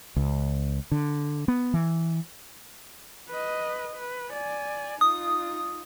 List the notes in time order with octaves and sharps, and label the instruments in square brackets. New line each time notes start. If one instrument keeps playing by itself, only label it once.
[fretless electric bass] C#2
D3
B3
E3
[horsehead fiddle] B4 D#5
B4
D5 G#5
[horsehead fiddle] D#4 F4 [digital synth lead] D#6